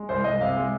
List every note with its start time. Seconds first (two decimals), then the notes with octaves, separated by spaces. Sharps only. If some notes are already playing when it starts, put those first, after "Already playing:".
Already playing: G#3
0.09 C2 C5
0.24 C2 D#5
0.41 C3 F5
0.56 G#3